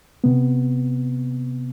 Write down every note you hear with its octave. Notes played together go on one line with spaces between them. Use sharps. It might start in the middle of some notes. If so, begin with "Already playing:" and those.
C3 B3